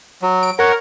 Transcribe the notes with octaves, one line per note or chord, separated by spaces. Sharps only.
F#3
D7
A#4 C#5 F#5